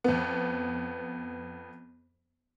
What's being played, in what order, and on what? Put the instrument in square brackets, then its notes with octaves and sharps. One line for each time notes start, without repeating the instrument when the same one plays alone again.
[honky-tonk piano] F2 B3